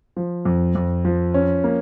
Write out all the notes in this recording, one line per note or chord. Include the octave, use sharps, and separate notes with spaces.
F3
F2
F2
F3
C#4
A#3